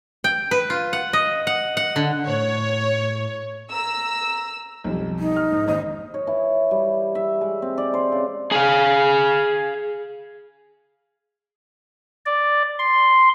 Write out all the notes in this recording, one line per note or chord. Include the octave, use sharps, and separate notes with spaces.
G5
B4
F4
F#5
D#5
F#5
F#5
D3
A2 C#5
A#5 E6
B1 F2 G3
D#4
F6
G#2
G#1 D#5 D#6
C#5
E3
G3
E5
G#3
C4
D5
C5
C#3
G#4 F5
D5
C6